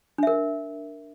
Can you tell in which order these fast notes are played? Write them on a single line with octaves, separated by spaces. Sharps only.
D4 E5 A#4